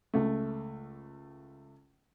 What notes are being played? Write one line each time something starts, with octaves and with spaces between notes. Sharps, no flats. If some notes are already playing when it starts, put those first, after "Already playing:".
C#2 A3